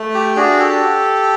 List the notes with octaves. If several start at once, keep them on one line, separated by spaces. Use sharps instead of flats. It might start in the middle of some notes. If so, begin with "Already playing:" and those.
Already playing: A3
G4
D4 F#4 G#4
G4 A4